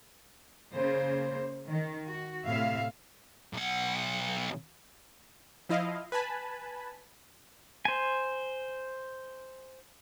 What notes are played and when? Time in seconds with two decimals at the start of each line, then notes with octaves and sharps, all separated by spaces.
0.72 C#3 A#3 C5
1.66 D#3
2.08 F#4
2.45 A2 C3 E5 F5
3.54 B1 F#5
5.69 F3 E4 D#5 F5
6.12 B4 G#5 A5 B5
7.85 C5 G#5